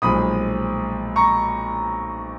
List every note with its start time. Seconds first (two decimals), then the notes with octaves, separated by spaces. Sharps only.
0.02 B1 A#2 F3 G#3 B5 D#6
1.16 A#5 C#6